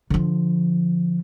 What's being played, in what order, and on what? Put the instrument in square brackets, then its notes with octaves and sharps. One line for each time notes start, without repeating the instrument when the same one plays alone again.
[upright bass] D3 F3